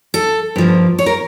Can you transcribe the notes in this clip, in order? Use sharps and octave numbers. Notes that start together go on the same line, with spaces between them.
A4
G2 F3 A#3
C#5
A#4